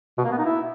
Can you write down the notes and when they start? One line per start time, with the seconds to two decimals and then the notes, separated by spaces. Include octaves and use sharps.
0.18 B2
0.25 A#3
0.32 B3
0.38 D#4
0.45 E4